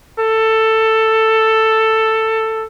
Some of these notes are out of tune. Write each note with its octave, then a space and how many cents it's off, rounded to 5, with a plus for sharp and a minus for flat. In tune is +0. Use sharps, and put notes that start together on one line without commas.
A4 +10